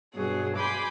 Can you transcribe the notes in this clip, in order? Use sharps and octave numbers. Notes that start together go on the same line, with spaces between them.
G2 B2 F#3 G#4
G#5 B5 C6 D6 G6